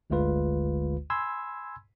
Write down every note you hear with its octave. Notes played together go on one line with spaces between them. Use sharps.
G1 D2 D3 G#3 F4 B4
G#5 B5 C6 E6 G#6